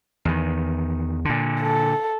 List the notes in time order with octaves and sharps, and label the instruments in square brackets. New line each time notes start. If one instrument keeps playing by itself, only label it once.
[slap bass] E2 D#3
A#2 D3
[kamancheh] A4